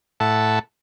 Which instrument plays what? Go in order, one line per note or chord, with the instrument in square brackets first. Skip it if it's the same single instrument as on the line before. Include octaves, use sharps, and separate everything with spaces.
[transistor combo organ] A2 A4 E5 F#5 A5